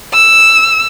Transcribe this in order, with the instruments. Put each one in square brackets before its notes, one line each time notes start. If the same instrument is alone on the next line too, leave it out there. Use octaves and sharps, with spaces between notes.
[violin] E6